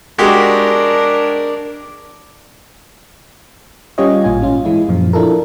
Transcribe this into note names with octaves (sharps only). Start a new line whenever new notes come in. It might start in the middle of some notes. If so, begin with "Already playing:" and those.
G#3 D4 F#4 G4 A#4
G3 C#4 F4 G4 C#5 D#5
A1 A#2 F4 G#5
G#2 C#4 F4
E3 G#3 E4
F#2 A#2 F3
D4 E4 F4 A4 A#4